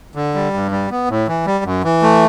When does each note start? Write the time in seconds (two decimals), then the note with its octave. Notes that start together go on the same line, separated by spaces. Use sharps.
0.15 D3
0.34 G3
0.54 G2
0.71 G3
0.90 B3
1.09 A2
1.28 E3
1.46 G3
1.65 F#2
1.84 E3
2.02 A3